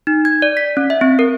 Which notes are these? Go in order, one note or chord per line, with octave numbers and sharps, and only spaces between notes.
D#4
G#6
D5
B6
C#4
E5
C4
A#4